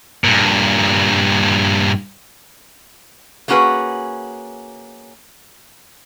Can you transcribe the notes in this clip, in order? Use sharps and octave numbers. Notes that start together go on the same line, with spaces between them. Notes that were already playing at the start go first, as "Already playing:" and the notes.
G2 A#2
A3 A#3 C#4 F#4 G#4 B4